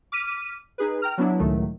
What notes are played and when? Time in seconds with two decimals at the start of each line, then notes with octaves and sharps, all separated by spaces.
0.12 D6 F6 B6 D#7
0.78 D#4 G#4 B4
1.02 G5 A#5 F6
1.18 F#3 B3 D4 E4
1.39 C#2 A2 D#3 F#3 A3